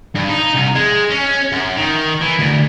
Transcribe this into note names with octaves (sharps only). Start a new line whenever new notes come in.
G2
D#4
C2
G#3
C#4
F#2
D#3
E3
D2